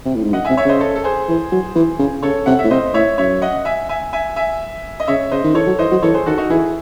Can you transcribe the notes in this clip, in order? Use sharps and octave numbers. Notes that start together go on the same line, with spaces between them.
C3
A2
G#2
F#2 D#5 F#5
C3 E5 G#5
C#5 E5
C#3 C5 D#5
A4 C#5
A4
G#4 C5
E3
F#3
E3
C#3
C#3 A4 C#5
C3 F#5
E5
A2
C3 C5 D#5
A2 C#5 E5
F#2 C#5 E5
D#5 F#5
E5 G#5
E5 G#5
E5 G#5
E5 G#5
D#5
C#3 C#5 E5
C#3 C5 D#5
D#3
E3 A4 C#5
F#3
E3 C5 D#5
F#3
E3 A4 C#5
G#4 C5
D#3 F#4 A4
D#4 F#4
E3 E4 G#4